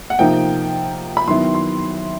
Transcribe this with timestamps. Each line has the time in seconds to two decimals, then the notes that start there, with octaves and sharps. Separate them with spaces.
0.10 F#5
0.19 C3 F3 A#3 D#4 G5
1.17 B5
1.28 D#3 F#3 B3 E4 C6
1.55 C6